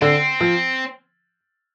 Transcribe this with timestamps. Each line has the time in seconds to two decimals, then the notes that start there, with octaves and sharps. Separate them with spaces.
0.01 D3 C4
0.41 F3